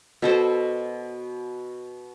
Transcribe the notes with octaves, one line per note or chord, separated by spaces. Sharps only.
B2 A4 C5